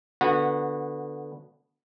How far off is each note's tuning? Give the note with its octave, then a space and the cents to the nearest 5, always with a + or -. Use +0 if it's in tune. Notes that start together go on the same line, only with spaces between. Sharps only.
D3 +0 B3 +0 F#4 -25